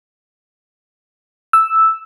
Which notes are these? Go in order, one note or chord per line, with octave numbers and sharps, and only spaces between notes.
E6